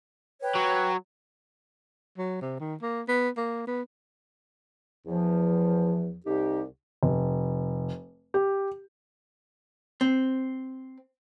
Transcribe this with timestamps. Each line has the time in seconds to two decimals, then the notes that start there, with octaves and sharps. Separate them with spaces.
0.42 B4 C#5 G5
0.55 F#3
2.18 F#3
2.42 C3
2.60 D#3
2.82 A#3
3.08 B3
3.37 A#3
3.67 B3
5.06 E2 F3
6.26 C2 D#4 G4
7.03 F1
8.34 G4
10.01 C4